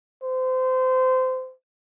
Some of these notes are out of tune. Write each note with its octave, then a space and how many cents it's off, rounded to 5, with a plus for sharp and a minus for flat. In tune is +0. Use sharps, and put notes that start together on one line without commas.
C5 -25